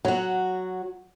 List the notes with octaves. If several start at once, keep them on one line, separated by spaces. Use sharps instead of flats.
F#3 F#4